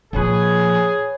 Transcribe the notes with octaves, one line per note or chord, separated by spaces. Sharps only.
A#2 F3 G#4 B4 C#5 G#5